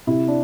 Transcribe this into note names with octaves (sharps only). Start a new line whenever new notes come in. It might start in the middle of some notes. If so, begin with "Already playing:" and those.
C3 E4
D4